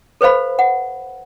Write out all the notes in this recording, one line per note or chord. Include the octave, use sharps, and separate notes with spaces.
A4 B4 C5 F5 B5
F#5